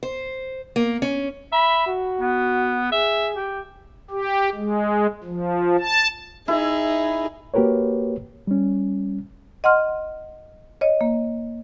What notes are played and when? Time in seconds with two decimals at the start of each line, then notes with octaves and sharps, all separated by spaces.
0.03 C5
0.76 A#3
1.02 C#4
1.53 E5 B5
1.87 F#4
2.20 B3
2.92 G#4 E5
3.35 G4
4.10 G4
4.55 G#3
5.24 F3
5.79 A5
6.48 D#4 E4 G#4
7.54 A#3 F#4 G4 A#4 B4 C#5
8.47 G3 C#4
9.64 D#5 F#5 C6 F6
10.81 C#5 D#5
11.01 A#3